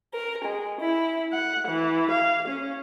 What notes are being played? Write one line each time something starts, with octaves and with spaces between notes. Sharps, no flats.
A#4
G#3
E4
F#5
E3
F5
C#4